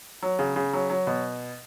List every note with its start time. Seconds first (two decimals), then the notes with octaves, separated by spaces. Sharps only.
0.22 F#3
0.39 C#3
0.56 C#3
0.73 F#3
0.90 F#3
1.07 B2